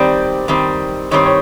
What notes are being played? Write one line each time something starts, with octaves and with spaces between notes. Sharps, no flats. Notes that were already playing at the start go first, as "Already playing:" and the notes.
Already playing: D#3 G3 C4 D5
D#3 G3 C4
D#3 G3 C4 C#5
C#5